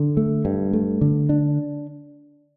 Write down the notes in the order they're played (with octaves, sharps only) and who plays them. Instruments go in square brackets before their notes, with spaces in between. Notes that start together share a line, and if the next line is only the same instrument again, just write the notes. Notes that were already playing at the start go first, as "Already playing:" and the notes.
Already playing: [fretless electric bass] D3
A3
G2
A3
D3
D4